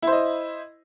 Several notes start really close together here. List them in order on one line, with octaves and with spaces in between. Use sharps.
E4 C5 D#5